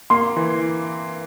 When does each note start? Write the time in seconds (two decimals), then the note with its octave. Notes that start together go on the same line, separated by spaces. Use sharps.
0.10 A#3 C6
0.37 E3